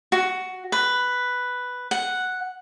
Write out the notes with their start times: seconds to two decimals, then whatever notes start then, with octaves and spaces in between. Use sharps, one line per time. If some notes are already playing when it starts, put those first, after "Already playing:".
0.12 F#4
0.72 B4
1.91 F#5